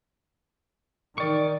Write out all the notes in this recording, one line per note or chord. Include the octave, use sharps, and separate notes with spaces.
D#3 D5 C#6